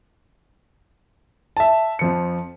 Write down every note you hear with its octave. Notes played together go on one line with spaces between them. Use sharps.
E5 A5
F2 F3 C#7